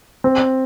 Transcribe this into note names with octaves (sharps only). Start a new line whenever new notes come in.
C4